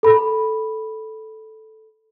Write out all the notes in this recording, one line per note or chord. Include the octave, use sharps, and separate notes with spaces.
A4 B5